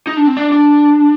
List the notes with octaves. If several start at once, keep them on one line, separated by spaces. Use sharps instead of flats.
D#4
D4
C4
D4
D4